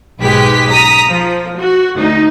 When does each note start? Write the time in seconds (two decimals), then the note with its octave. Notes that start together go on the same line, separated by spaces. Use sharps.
0.20 B1 G#2 G#3 G4 B4 B6
0.69 A#5 D#6 B6
1.08 F3
1.58 F#4
1.94 D2 D#4